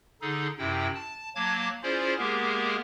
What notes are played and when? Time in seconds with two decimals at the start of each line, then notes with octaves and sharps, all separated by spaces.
0.21 D3 D#4 G#4 A4
0.58 F#2 C3 E4 G5
0.95 A5
1.35 F#3 A#3 A5 D6 G#6
1.83 C#4 E4 F4 G#4 C5 D5
2.18 G#3 A#3 B3 G4 G#4 A#4